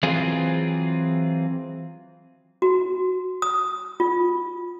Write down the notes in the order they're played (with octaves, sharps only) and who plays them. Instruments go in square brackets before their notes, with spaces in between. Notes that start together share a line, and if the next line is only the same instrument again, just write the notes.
[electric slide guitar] E3 F#3 C4 F4 G#4
[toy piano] F#4
D#6
F4